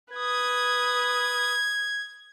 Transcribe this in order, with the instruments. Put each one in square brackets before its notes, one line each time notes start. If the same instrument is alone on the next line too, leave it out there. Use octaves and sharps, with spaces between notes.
[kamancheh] B4 D#6 [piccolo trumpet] G#6